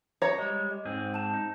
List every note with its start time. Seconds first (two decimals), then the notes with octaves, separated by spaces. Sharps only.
0.22 C#5 A#5 A#6 C#7
0.38 G3 G#3 D#5
0.71 D#5
0.85 G#2 C4 G#4
1.14 A5 E7
1.34 D#4